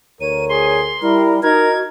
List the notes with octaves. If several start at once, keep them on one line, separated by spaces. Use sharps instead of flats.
D2 A#4 C#5 D#7
G#4 C6
G3 E4 A#4
D#4 F#4 A#4 G#6